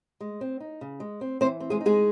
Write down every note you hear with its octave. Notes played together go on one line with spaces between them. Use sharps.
G#3
C4
D#4
C#3
G#3
C4
E3 C4 C5
C4
G#3 G#4
D#4
G#3 G#4